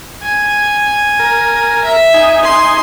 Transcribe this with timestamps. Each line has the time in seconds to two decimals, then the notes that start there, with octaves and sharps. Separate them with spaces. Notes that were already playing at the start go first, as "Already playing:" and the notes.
0.23 G#5
1.20 A#4
1.84 E5
2.14 D#4 G#5
2.43 C6